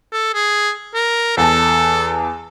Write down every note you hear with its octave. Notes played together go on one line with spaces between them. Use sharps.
A4
G#4
A#4
E2 A4 A5